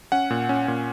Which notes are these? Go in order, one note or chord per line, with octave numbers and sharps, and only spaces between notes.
C#4 F#5
A#2
C#4
A#2